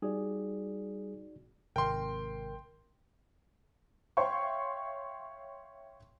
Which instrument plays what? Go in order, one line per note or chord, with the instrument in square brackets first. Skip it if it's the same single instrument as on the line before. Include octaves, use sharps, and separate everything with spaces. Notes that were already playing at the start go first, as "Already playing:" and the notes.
[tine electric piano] G3 G#4 [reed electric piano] D#4 F#4 D5
[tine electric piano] G#1 A#4 [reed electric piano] C3 [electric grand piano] G5 C6
[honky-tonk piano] C#5 E5 F5 G5 C6 C#6